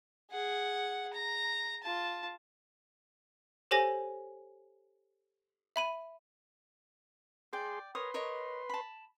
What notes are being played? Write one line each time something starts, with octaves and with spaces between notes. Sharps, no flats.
G#4 F#5
A#5
F4 A5
G4 A4 C5 C#5 G#5 A#6
E5 B5 D#7
G#4 D5 G5 C6
A#4 B4 C#5 C6 D#6
A#4 C#5 D#5
A5 B5